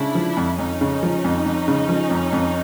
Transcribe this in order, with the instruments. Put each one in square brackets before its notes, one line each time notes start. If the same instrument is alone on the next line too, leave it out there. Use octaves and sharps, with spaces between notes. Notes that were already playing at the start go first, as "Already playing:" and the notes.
Already playing: [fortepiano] C#3 [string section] D4 E4
[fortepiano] F3
F2
[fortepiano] F2 [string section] C#4 D#4
[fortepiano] C#3
F3
F2
F2
C#3
F3
F2
F2